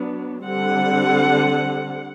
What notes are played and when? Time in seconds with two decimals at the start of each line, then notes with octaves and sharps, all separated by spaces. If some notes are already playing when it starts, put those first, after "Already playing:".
Already playing: F#3 B3 D4
0.45 D3 G3 C4 F#5